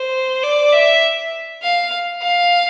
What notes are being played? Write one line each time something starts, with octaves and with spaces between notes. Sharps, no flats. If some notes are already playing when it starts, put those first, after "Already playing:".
Already playing: C5
D5
E5
F5
F5